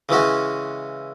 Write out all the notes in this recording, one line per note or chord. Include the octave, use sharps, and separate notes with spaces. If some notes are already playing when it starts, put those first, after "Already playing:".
C#3 E3 G#3 C#4 F#4